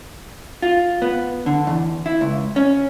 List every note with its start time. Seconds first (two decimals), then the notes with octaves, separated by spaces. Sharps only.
0.62 F4
1.02 B3
1.46 D3
1.67 E2
2.06 E4
2.21 C#2
2.56 C#4